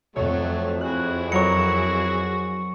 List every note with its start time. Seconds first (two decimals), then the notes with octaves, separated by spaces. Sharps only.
0.16 F2 F#3 A3 C#5
0.81 E4 F#4 G#4 F#6
1.32 F#3 A#4 C#5 C#6 C#7